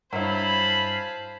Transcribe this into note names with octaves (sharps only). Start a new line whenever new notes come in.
G2 F#3 E4 C5 F5 G#5 A5 B5